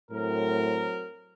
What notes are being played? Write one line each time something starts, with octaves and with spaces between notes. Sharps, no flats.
A2 F#3 C4 A#4